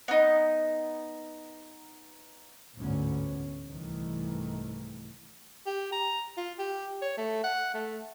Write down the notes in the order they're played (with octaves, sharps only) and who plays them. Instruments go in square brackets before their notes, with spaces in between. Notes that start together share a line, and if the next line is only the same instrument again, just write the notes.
[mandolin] B3 D#4
[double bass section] A1 D2 G#2 B3 C#4
C2 G#2 D#3 E3 A3
[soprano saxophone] G4
A#5
F4
G4
C#5
A3
F#5
A3